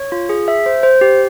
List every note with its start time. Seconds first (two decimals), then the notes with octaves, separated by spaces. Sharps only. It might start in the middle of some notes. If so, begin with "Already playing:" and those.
Already playing: C#5
0.12 F4
0.29 G#4
0.48 E5
0.66 C5
0.83 C5
1.01 G4